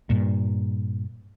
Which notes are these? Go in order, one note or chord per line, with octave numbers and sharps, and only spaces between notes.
G2 A#2